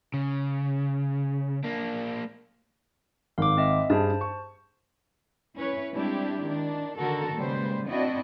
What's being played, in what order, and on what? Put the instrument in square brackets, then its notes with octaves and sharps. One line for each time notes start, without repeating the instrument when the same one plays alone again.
[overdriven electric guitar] C#3
A#3 D4
[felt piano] G#1 [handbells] F5 D6
[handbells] C4 D#5 E5
[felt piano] G2 G#4 [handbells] C5 A5
[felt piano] C#6
[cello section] C#4 E4 B4 C#5
G3 G#3 C4 D4 E4 G4
D#3 D4
D3 D#3 F#4 A4 A#4
A#2 C#3 G3 G#3 B4 C5
C4 D4 E4 F#4 D5 D#5